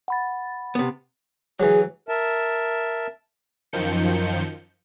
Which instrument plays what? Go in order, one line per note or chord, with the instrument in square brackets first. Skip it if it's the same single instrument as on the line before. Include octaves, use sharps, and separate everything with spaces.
[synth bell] F#5 B5 A6
[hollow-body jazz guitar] C3 B3
[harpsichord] E3 F#3 [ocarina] G#4
[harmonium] A#4 E5 A5
[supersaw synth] F#2 D#3 F3 G6 C#7